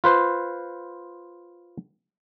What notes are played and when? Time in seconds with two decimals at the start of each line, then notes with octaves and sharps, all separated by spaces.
0.04 F4 B4 C5